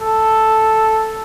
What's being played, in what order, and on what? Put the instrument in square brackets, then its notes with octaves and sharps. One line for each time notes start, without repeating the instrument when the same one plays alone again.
[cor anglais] A4